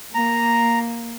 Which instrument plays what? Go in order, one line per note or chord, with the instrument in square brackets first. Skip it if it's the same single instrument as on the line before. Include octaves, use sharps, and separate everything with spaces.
[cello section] A#3 [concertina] A#5